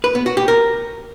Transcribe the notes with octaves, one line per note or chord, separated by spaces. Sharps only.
B4
B3
F#4
G4
A#4